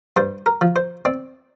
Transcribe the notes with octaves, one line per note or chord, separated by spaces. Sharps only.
G2 C5
A#4
F3
C5
C4 D5